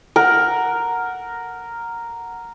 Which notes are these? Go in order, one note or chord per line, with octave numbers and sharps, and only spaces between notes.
A#4 F#5